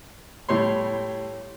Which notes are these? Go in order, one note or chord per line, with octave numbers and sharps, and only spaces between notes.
A2 G3 C#5 C6